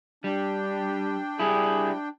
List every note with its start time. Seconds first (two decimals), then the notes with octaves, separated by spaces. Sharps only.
0.24 G3 D4 G5
1.40 G3 E4 G#4